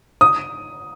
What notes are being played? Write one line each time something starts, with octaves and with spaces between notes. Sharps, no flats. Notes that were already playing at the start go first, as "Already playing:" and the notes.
D#6